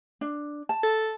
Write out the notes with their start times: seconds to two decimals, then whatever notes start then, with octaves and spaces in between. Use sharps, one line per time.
0.21 D4
0.69 A5
0.83 A4